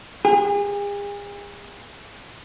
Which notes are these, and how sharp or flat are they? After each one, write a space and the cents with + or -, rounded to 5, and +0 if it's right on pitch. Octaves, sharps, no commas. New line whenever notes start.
G#4 -40